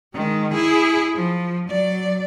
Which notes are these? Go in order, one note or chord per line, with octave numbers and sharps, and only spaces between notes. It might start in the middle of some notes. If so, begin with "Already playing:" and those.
D#3 G#3
E4 G#4
F3
F#3 D5